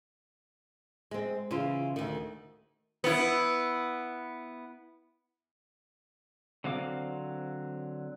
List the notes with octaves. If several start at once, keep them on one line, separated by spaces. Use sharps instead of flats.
G#3 C4
C#3 E3 F4
D2 D#3
B3 E4
D3 F#3 C4 F5 D6